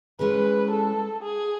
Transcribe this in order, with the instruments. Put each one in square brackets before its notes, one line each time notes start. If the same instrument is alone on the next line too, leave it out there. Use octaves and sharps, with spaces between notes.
[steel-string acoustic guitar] G#3 C#4 E4 G#4 [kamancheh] B4
[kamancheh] A4
G#4